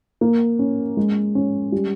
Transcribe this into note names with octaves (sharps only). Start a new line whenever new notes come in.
A#3
C#4
G#3
C#4
G3